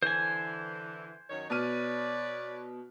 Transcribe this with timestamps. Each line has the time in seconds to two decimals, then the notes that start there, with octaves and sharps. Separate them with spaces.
0.03 D3 E3 C5 G#5
1.30 F#2 D#3 C#5
1.50 B2 B4 C#5 D5 F6 D#7